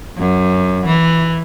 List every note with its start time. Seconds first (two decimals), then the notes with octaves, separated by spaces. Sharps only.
0.18 F#2
0.86 E3